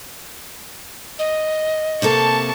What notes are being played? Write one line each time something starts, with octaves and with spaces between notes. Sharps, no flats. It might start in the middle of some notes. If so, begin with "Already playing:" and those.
D#5
C3 A#3 A4 A5 C#6